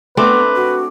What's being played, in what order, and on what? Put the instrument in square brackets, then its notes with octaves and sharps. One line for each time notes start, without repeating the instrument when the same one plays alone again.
[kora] A3 C4 D4 [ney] B3 [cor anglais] B4 [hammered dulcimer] D6
[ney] F#4